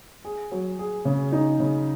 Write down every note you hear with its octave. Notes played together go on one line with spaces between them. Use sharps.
G#4
F#3
G#4
C#3
D#4
C#3